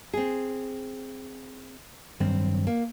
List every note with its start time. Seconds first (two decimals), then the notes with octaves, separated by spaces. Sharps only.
0.14 C4 G#4
2.20 G2 D#3 F#3 C4
2.67 A#3